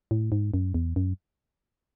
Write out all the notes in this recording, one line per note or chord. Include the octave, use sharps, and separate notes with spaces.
A2
G#2
F#2
E2
F#2